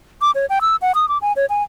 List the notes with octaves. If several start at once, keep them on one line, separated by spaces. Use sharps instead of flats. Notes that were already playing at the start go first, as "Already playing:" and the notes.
D6
C#5
G5
E6
F#5
D#6
D6
G#5
C#5
G#5